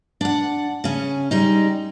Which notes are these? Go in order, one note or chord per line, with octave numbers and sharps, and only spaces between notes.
D4 F#5
C#3 C#4
G3 G#3 D#4